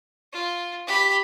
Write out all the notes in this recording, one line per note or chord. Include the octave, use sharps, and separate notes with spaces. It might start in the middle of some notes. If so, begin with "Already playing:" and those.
F4
G4 B5